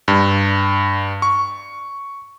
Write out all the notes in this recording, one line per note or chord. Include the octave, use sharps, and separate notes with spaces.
G2
C#6